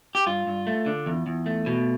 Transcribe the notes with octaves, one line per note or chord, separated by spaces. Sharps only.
G4
G2 F4
G2
A3
D3
E2
E2
A3
B2